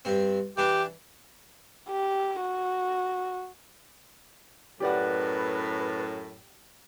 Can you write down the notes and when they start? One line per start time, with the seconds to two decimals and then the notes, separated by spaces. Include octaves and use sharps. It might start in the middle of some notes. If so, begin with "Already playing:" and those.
0.05 G2 C4
0.57 E3 D4 G4
1.88 G4
2.41 F#4
4.80 F#2 A2 G4 B4 D5 F#5